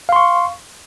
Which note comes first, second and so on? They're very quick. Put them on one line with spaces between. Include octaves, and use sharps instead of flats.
F5 C6 C#6